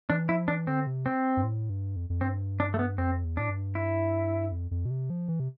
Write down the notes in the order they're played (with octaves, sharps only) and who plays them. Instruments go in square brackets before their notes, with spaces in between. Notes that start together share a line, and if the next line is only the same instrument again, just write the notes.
[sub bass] E3 [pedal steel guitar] D4
[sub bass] F3 [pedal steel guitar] E4
[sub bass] E3 [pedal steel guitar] D4
[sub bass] D3 [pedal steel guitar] C4
[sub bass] C3
[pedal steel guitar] C4
[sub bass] G2
A2
G2
F2
F2
[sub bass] G2 [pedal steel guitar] C4
[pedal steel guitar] D4
A3
B3
[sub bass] F2 [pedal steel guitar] C4
[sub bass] E2
[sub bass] A2 [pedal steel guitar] D4
[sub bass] G2
[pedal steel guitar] E4
[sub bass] F2
F2
B2
C3
F3
E3
C3